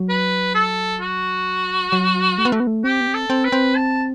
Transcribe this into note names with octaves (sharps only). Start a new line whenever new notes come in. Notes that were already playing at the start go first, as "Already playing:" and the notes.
Already playing: F#3
B4
A4
F#4
F#3
A3
B3
A3
B3
A3
C4 G4
B3
C4
A4
C4
B4
C4
A5